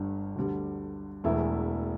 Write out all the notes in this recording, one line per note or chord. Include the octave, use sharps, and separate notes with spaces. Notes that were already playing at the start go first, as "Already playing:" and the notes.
Already playing: G1 G2 D3
D2 D3 G3
E1 E2 E3 A3 E4